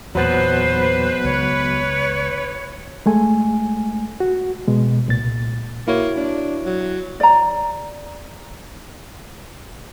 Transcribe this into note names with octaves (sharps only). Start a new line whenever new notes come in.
E2 A#2 F#3 B3 B4 C5 A6
C#2 C#5
G#3 A3 G#5
F#4
B2 G#3
C2 A#2 A6
A#3 E4 F#4 C#5
D4
F#3
D5 A#5